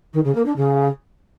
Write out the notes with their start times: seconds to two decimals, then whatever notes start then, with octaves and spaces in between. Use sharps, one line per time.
0.13 D#3
0.24 C#3
0.35 A#3
0.45 D4
0.56 C#3